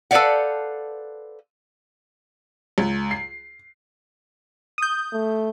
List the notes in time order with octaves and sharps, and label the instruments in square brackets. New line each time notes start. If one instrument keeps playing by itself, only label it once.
[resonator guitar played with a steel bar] A4 B4 C5 D5 F5 F#5
[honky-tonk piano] C#2
C7
[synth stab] D#6 G6
[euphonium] A3